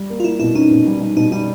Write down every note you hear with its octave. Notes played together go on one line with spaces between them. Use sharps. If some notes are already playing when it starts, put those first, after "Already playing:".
Already playing: G3
A#3
F4
A#3 E4
B2 E4
C#4 D#4
B2
G3
G3
B2 D#4
G3 D#4